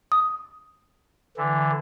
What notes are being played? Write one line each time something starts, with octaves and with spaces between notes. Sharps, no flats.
D#6
D3 E3